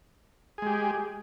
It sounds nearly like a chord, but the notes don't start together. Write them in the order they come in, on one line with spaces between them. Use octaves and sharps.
G#4 G#3 G4